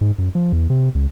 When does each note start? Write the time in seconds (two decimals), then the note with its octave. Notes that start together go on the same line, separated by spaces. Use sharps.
0.01 G#2
0.18 F#2
0.35 F3
0.52 E2
0.70 C3
0.95 C#2